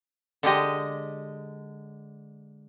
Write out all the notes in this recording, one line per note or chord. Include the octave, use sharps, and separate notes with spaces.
D3 G#3 G4 D#5